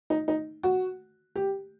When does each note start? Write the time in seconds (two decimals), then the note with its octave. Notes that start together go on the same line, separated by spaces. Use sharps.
0.10 D#4
0.28 D#4
0.63 F#4
1.36 G4